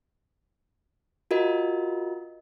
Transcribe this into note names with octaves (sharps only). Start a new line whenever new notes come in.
F4 F#4 A#4 D#5